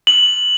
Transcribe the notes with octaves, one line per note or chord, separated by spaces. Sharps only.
F#7